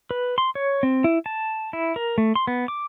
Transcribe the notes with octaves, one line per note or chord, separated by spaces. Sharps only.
B4
C6
C#5
C4
E4
A5
E4
A#4
A3
C6
B3
D6